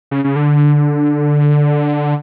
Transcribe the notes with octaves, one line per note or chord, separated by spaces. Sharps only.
C#3
C#3
D3